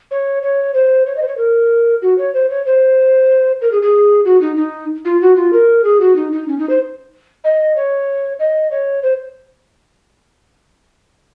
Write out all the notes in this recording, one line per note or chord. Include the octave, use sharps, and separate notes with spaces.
C#5
C#5
C5
C#5
D#5
C5
C#5
A#4
F#4
C#5
C5
C#5
C5
A#4
G#4
G#4
F#4
D#4
D#4
F4
F#4
F4
A#4
G#4
F#4
D#4
D#4
C#4
D#4
C5
D#5
C#5
D#5
C#5
C5